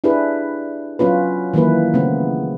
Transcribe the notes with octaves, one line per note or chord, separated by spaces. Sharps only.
D4 E4 G4 G#4 B4
F#3 B3 C#4 F4 B4
D#3 E3 F#3 A#3 E4 B4
C#3 A3 B3 C4